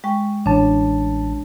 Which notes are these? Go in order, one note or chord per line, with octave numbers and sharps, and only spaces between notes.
G#3 G5 C#6
A1 C#4 D4 C#5 A5